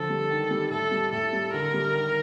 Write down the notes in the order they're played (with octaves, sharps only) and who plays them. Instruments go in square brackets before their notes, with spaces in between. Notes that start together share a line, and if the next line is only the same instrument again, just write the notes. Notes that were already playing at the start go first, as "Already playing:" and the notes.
Already playing: [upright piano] D3 F3 [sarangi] A4
[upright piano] G3
D#3
G3
[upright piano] A2 [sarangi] A4
[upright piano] G3
[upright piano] A2 [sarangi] A4
[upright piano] G3
[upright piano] D3 [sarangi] A#4
[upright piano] G3
D#3